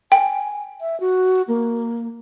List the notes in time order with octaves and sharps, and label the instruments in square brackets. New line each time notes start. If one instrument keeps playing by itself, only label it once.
[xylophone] G5 [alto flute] G#5
[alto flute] E5
F#4
A#3